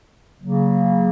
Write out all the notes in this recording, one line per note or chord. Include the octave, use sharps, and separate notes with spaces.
C#3 F#3 A#3